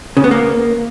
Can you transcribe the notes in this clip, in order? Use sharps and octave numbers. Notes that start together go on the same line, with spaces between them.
C#3
B3
A#3